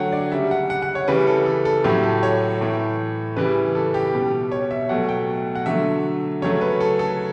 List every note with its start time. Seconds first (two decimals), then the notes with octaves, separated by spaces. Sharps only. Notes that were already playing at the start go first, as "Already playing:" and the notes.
Already playing: D3 F#3 A3 C#5 F#5 G5
0.12 D5
0.32 C#3 G3 E5
0.51 F#5
0.70 F#5
0.82 F#5
0.95 C#5
1.08 C#3 E3 G3 B4
1.27 A4
1.46 A4
1.65 A4
1.84 A2 F#3 A3 G4
2.03 A4
2.23 C#5
2.61 A2 E3 A3
3.36 C#3 E3 G3 B4
3.75 A4
3.94 G4
4.13 B2 G3
4.52 C#5
4.71 E5
4.89 B2 F#3 A3 F#5
5.09 G5
5.55 F#5
5.66 D3 F#3 A3 E5
6.42 C#3 F#3 A3 C#5
6.61 B4
6.81 A4
6.99 A4